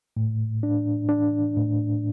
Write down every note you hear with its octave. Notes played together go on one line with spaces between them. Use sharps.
A2
D4
D4
A2